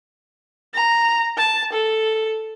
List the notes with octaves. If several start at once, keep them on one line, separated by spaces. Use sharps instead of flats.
A#5
A5
A4